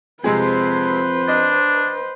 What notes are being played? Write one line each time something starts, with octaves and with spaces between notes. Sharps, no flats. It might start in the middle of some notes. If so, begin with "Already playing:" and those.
F2 C3 G#3 G#4 B4 C5
D4 D#5